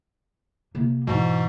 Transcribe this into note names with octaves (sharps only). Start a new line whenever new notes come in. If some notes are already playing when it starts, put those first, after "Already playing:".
C3 A#3
G#2 B2 E3